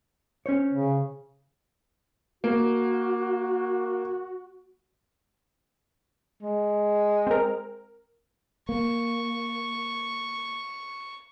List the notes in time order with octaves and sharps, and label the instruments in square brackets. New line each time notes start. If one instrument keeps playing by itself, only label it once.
[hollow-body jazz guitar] C#4 C5 C#5
[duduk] C#3
[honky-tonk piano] A#3 [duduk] F#4
[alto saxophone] G#3
[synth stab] C4 A#4
[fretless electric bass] A#3 [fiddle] C#6